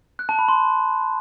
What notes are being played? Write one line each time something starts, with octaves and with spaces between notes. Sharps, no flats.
F#6
A5
B5
C6